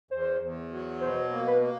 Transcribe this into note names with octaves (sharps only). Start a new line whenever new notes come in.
E2 C5
E2
F#3
B2 C5
A#3
B4
A#3